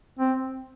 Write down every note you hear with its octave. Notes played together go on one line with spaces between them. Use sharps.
C4